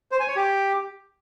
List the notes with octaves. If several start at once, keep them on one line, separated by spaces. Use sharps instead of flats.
C5
G#5
C#5
G4